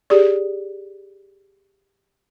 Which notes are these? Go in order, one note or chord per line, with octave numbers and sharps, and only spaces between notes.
G4 G#4 D5